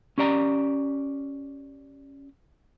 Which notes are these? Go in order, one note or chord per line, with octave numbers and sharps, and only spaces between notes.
C#4 G4 D5 A#5